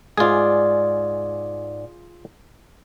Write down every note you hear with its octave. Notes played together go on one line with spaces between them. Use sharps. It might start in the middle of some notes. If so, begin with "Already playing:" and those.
G#2 F4 G#4 D5